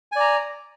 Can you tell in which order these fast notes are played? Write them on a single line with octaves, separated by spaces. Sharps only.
G#5 D5 A#5